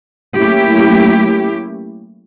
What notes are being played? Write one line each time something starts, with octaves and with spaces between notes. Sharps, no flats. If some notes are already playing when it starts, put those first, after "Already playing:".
F#3 A3 A#3 C#4 E4 G4